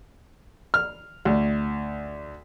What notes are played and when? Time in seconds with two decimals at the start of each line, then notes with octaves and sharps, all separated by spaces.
0.74 F6
1.25 D2